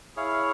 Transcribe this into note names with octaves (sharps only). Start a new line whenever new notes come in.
E4 G#4 C#5 F5